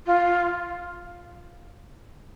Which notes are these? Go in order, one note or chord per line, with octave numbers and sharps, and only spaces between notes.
F4